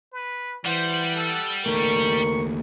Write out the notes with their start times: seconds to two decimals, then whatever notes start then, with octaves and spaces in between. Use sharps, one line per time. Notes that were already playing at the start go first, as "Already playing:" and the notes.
0.12 B4
0.66 E3 G3 C5 F#5
1.15 A4
1.66 D#2 A3 A#4 C#6